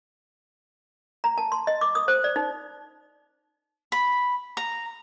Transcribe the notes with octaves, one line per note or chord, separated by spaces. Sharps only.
A#5
A5
C6
D#5
D6
D#6
C5
D5
D#4
B5
A#5